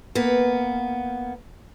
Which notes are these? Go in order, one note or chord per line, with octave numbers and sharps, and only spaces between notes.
A#3 B3